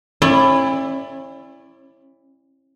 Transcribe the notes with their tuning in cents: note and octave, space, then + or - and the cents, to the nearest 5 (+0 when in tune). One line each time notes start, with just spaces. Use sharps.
C#4 -40 E4 +10 D5 +0